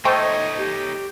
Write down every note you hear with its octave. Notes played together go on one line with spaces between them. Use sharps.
A3 D#4 C5 C#5 D#5 G5
G4